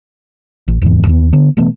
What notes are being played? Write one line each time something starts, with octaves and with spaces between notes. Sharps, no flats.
A1
D1 E2 G#2 E3
D#2 B3
D3 B3
B2 E3 A3 B3